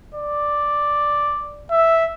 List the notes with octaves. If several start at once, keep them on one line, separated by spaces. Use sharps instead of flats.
D5
E5